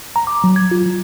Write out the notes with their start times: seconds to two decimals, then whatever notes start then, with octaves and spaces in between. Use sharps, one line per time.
0.16 A#5
0.27 D6
0.44 F#3
0.56 G#6
0.71 F4
0.86 F#3